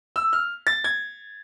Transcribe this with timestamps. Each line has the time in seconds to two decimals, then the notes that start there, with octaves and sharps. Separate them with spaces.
0.16 E6
0.33 F6
0.67 A6
0.84 G#6